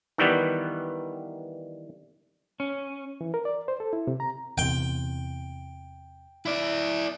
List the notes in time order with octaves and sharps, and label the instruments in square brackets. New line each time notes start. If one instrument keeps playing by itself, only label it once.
[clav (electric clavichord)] D#3 E3 G3 B3
[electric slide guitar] C#4
[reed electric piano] E3
A#4
D5
C5
A4
E4
C3
A#5
[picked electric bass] E2 C3 [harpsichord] G5
[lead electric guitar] E4 D5